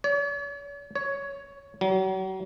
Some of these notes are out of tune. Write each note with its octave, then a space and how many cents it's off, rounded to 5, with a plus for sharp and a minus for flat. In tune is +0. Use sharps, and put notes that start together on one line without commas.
C#5 +45
C#5 +10
F#3 +40